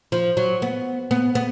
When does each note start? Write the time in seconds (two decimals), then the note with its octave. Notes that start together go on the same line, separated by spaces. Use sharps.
0.12 F3
0.37 F#3
0.62 B3
1.11 B3
1.35 B3